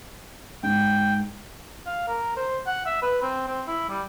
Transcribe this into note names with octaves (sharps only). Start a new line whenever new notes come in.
G#2 G5
F5
A#4
C5
F#5
E5
B4
C4
C4
E4
G3